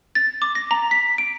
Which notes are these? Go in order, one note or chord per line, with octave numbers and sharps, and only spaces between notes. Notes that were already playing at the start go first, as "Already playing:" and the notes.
A6
D6
A#6
A#5
B6
D7